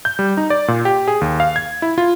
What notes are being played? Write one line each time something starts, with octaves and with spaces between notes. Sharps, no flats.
G6
G3
D#4
D5
A#2
G4
G#4
D#2
F5
G#6
E4
F4